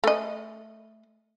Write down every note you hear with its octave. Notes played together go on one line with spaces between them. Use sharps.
A3 D#5